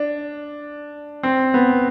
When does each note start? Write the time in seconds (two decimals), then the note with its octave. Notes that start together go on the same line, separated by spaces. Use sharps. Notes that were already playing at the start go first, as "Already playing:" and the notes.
Already playing: D4
1.23 C4
1.54 B3